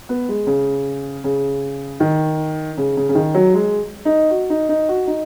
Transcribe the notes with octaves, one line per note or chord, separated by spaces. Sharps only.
B3
G#3
C#3
C#3
D#3
C#3
C#3
C#3
D#3
F#3
G#3
D#4
F#4
D#4
D#4
F#4
D#4